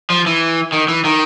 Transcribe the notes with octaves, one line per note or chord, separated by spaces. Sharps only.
F3
E3
D#3
E3
D#3